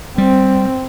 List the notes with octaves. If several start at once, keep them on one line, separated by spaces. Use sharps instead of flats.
G3 C4